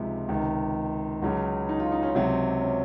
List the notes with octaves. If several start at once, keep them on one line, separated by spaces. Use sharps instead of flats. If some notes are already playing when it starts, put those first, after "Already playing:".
Already playing: C#2 C3 F3 G#3 D#4
C#2 C3 D#3
C#2 C#3 F#3
D#4
F4
D#4
C#4
C#2 C3 F#3 C4
C#4